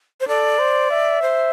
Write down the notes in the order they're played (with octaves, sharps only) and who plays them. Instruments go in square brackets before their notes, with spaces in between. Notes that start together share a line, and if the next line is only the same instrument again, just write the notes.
[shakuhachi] C5
[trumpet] A4 [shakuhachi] D5
[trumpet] C5
E5
[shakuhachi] C5